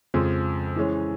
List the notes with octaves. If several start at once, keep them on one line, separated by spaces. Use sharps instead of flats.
F2 C#3 F3 G#3
E3 G#3 C#4